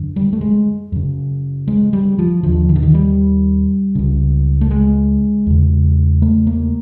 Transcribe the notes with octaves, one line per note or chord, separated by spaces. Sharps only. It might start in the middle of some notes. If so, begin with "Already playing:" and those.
Already playing: F#2 D3
G3
A3
G#3
F#2 C#3
G#3
G3
F3
D#2 D3 F3
D#3
D3
D#3
G3
C#2 C#3
A3
G#3
E2 C#3
A3
A#3